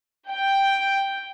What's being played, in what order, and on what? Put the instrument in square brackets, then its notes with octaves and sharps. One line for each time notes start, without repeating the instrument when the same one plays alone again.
[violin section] G5